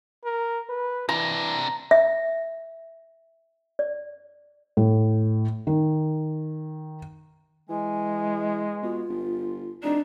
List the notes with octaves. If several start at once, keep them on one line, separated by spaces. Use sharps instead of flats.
A#4
B4
C3 E3 D4 A#5
E5
D5
A2
D#3
E3 G#3 G#5
B2 F4
G1
F1 D4 D#4 D5